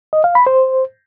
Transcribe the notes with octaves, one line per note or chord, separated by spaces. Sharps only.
D#5
F5
B5
C5